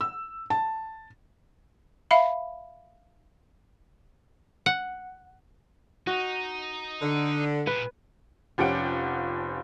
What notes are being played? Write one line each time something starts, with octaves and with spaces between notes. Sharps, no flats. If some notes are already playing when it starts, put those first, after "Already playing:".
E6
A5
E5 F5 B5
F#5
D#4 F#4
D3
A#2 B3 B4
F1 F3 C#4 G4 F#5 D7